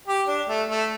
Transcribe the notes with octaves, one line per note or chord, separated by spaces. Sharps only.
G4
D4
A3
A3